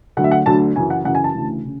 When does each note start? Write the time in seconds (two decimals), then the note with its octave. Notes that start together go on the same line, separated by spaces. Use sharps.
0.17 D2 D3 F#3 F#5
0.24 E5
0.31 F#5
0.46 D2 D3 F#3 A5
0.76 F#2 C#3 E3 G#5
0.90 F#5
1.04 F#2 C#3 E3 F#5
1.15 G#5
1.24 A5
1.35 D2 C#3 E3
1.65 C#3